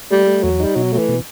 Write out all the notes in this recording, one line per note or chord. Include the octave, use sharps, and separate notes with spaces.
G3 A3
A3
E2 F#3
G3 D#4
B2 F#3
F#3 A3
E3
B2